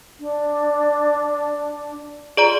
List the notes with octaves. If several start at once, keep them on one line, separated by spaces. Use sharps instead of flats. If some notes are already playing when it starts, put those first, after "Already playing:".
D4
F4 G#4 D5 A#5